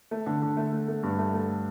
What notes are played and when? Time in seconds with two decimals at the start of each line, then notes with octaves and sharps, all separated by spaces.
0.11 A3
0.26 D3
0.42 D3
0.57 A3
0.73 A3
0.88 A3
1.03 G2
1.18 A3
1.34 A3